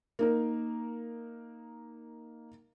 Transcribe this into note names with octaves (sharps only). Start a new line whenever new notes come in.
A#3 D#4 A#4